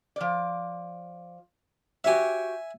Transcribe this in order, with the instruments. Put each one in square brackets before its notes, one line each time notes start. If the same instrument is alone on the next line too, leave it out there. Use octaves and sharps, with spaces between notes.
[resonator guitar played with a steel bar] F3 D5
[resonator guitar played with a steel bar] F#4 G4 C#5 [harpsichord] E5 G#5